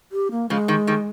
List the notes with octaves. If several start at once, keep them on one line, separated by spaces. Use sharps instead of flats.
G4
A#3
C#3 F3 G#3
D#3 G3
D#3 G3